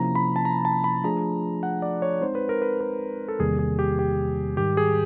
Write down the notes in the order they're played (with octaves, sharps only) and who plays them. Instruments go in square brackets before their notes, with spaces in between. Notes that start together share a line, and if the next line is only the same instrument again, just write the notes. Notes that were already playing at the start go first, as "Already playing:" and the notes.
Already playing: [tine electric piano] C3 F3 A#3 C#4 E4 [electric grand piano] A#5
[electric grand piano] B5
A5
A#5
A5
B5
[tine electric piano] F3 A3 D4 F4 G#4 [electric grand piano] A#5
[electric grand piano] F#5
D5
C#5
[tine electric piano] G#3 C4 D#4 [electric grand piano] C5
[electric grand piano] B4
A#4
B4
A#4
A4
[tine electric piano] E2 C3 D#3 G3 A#3 [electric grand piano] G#4
[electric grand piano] G#4
G4
G4
[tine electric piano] G#2 D#3 G3 [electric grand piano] G4
[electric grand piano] G#4